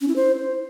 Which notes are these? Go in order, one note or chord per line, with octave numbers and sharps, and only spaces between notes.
C#4
E4
C5